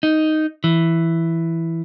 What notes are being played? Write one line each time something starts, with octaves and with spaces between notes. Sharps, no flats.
D#4
E3